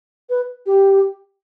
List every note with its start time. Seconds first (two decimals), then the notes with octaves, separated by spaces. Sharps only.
0.29 B4
0.66 G4